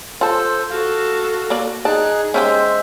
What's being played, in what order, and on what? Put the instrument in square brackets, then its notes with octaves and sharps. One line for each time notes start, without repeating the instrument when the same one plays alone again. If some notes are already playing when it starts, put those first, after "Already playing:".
[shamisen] F4 A5 [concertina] A4 C5
[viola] F#4 A4 [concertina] F5
[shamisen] A#3 D5
[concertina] D#4 F#6 [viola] G#4 [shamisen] D5 A5
[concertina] G#3 C5 E5 [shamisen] C#4 D#4 G4